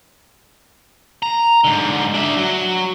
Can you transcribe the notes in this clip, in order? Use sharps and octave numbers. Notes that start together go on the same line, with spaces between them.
A#5
G#2 D3
D4 E5
F#3